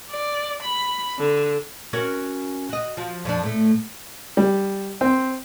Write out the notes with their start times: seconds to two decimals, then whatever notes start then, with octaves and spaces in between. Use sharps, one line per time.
0.11 D5
0.62 B5
1.18 D3
1.93 C#4 F#4 A#4
2.69 F#4 D#5
2.97 F3 F#4
3.25 F2 F3 D4
3.43 A2 A3
4.37 G3
5.01 C4